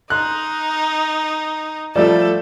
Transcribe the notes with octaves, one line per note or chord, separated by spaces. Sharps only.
D#4 C6 F#6
F3 G3 A3 A4 D5